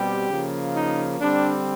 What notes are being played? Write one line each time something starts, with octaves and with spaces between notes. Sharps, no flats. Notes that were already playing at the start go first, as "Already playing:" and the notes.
Already playing: B2 G3 C4 G4
C#3 F3 A#3
D#4
D3 G3 C4 D4